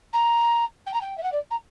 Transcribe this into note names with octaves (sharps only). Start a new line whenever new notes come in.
A#5
G5
A#5
G5
E5
F#5
D5
A#5